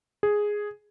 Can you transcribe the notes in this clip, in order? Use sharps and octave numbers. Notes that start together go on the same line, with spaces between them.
G#4